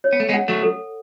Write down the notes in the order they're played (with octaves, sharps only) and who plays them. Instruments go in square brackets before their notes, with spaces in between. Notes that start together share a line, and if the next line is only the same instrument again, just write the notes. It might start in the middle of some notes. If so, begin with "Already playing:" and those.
[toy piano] C#5
[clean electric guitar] B3
A3
G#3 B3
[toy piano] F#5
[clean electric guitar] F#3 A3
[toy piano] A4